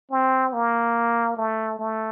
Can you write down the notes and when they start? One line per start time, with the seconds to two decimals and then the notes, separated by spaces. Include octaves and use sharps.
0.11 C4
0.53 A#3
1.37 A3
1.79 A3